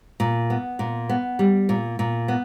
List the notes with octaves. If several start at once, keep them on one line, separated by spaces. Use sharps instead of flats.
A#2
B3
A#2
B3
G3
A#2
A#2
B3